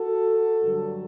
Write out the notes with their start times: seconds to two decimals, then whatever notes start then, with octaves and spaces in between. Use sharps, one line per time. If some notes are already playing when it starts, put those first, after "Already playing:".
Already playing: F#4 A4
0.64 G2 D3 F#3